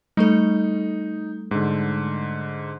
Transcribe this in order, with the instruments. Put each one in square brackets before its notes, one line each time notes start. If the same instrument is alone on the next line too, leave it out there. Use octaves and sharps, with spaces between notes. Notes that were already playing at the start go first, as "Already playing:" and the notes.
[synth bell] G3 A3 A4 [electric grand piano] D#4
[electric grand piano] G#2 D3